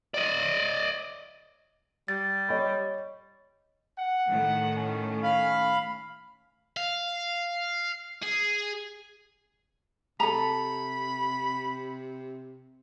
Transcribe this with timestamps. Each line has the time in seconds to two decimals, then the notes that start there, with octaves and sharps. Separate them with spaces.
0.14 D5 D#5
2.08 G3 A6
2.49 C#5 D#5 B5
3.99 F#5
4.30 A2 D#3 A3
4.75 C#4
5.23 F5 B5
6.77 F5
8.23 G#4
10.20 C3 A4 A#5 B5